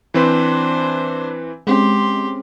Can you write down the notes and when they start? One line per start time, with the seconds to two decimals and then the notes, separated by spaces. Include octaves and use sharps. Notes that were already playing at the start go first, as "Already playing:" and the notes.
0.14 E3 C4 D4 B4 C5
1.67 G#3 C4 C#4 G4 C6